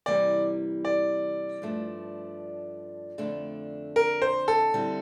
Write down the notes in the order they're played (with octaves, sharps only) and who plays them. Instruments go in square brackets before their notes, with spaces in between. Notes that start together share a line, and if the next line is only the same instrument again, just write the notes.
[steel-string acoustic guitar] C3 E3 G3 A#3 [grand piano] D5
[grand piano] D5
[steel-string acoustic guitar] G2 F3 A3 D4
F2 D3 A3 D4
[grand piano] A#4
C5
A4
[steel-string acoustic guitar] D3 G3 C4 E4